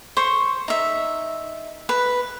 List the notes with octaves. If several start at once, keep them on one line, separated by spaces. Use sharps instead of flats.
C5 C#6
D#4 E5
B4